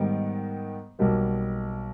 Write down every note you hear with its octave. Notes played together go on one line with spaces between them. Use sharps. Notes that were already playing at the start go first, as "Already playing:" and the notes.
Already playing: G#2 D#3 G3 B3 D#4
B1 B2 G3 A#3